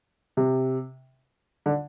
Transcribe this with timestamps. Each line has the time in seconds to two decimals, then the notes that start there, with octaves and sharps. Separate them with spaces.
0.37 C3
1.66 D3